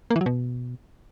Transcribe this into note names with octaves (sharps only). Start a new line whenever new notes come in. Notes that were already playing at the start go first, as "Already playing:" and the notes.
A#3
E3
F#3
B2